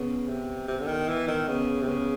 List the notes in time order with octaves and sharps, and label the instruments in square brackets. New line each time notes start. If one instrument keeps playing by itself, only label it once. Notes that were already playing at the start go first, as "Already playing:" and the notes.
Already playing: [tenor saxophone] C#3 [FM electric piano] B3
[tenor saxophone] C3
C3
D3
D#3
E3
D#3
[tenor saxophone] C#3 [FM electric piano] B3
[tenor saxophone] C3
[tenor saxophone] C#3 [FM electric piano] B3